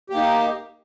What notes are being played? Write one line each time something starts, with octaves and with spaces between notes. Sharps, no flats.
A#3 D#4 G4